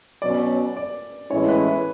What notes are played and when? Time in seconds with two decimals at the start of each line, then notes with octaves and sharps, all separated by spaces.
0.22 B2 F#3 C#4 D5
0.77 D5
1.31 A2 E3 G#3 C#4 E4 C#5
1.49 B4
1.68 B4